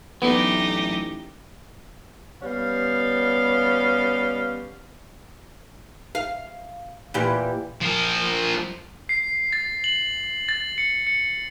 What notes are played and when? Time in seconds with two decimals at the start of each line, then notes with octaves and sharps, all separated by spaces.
0.22 A1 F#3 A3 B3 D4 D#4 G4
2.42 G3 B3 C#4 F5
6.15 F5
7.14 A#2 E3 G4
7.81 F3 A#4
9.09 C7
9.53 A6
9.84 F#7
10.49 A6
10.78 C#7
11.07 C#7